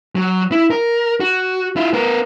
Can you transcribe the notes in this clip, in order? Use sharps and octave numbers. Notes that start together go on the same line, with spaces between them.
F#3
E4
A#4
F#4
E4 F4
B3 A#4